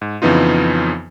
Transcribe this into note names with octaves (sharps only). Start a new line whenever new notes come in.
G#2
F2 C#3 E3 B3 D#4 F4